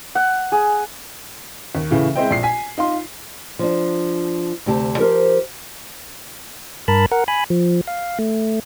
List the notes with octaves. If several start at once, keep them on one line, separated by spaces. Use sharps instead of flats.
F#5
G#4
D#2
A2 C#3 E3
G#3 C4 E4 C5 D#5 G5
A#1 C7
G#5 B6
D#4 F4 C6
F3 D4
D2 C3 G4 A5
F3 G4 A#4 C5
G2 A#4 A5 B5
A#4 F#5
G#5 B5
F3
F5
A3